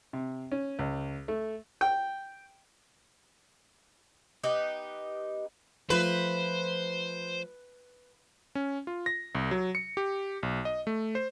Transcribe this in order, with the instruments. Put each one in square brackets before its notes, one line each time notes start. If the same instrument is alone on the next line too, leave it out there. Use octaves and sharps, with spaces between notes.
[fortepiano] C3
C#4
C#2
A3
G5
[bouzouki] B3 D#4 G4
[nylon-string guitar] F3 A3 [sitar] B4 [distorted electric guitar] C5
[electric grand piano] C#4
F4
A#6
C2
F#3
C#7
G4
B1
D#5
A3
C5